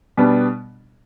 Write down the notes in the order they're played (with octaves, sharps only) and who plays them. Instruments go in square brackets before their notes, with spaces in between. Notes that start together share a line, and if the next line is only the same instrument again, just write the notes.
[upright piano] B2 G3 B3 D4